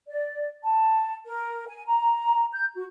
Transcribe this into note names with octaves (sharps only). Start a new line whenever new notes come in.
D5
A5
A#4
G#5
A#5
G6
F#4